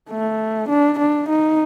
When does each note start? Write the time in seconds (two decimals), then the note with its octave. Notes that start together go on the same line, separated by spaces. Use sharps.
0.10 A3
0.69 D4
0.99 D4
1.29 D#4